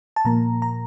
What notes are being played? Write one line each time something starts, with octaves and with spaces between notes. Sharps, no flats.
A5
A#2 F3 A#3 A#5
A#5